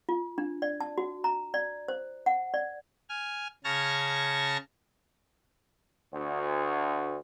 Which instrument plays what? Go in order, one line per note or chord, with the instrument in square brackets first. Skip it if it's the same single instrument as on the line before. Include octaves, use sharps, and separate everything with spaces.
[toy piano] F4
D4
D5
A5
F#4
A#5
D5
C5
F#5
D5
[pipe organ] G#5 F6
C#3 A5 C#6 F6 G#6 A#6
[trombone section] D2